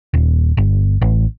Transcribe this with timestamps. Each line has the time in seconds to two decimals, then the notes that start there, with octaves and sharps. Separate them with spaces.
0.14 D#1
0.57 G1
1.02 A1